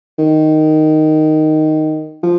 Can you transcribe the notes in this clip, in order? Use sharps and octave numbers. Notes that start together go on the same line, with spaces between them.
D#3
F3